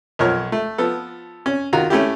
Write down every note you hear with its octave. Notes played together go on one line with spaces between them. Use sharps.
B1 F3 A#4 C#5 F6
A3
F3 B3 A4
C#4
D#3 F4 F#4 A#5
A3 C#4 E4 G4